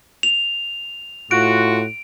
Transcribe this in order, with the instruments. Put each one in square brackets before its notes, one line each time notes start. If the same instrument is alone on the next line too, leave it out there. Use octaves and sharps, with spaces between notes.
[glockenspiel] F7
[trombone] A2 [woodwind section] F4 F#4 [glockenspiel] D7